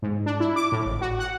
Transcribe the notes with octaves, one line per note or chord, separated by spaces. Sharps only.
G#2
D4
E4
D6
A2
G#1
F#4
F#5